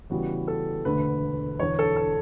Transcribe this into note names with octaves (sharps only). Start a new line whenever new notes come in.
E2 C#3 E3 G3 B3 F#4
A4
E1 D2 D3 A3 B4
E1 E2 D3 C#5
A4
A4